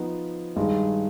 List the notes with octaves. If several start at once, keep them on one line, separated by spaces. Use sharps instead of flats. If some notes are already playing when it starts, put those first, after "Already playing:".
Already playing: F3 B3 D#4
G2 D#3 G#3